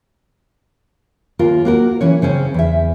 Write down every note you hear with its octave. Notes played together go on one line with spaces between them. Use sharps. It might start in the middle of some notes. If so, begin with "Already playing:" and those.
D#2 F4 A#4
A#3 F#4 A#4
E3 C#4 C#5
C#3 C4 C#4
E2 E5